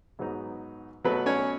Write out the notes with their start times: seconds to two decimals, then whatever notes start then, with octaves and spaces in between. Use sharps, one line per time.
0.19 G#2 F#3 B3 D#4
1.04 B2 F#3 A3 B3 B4
1.26 C#4 C#5